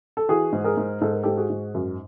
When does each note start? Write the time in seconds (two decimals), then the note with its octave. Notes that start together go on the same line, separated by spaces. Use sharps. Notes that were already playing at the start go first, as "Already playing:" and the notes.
0.17 A4
0.29 E3 F#4 G#4
0.53 G#2
0.64 G#4 A#4
0.77 G#2
1.01 G#2 A4
1.13 A#4
1.23 G#2 G4 A4
1.37 F#4 G#4
1.50 G#2
1.74 F#2